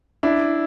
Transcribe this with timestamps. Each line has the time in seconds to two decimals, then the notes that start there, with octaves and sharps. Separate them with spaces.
0.23 D4 E4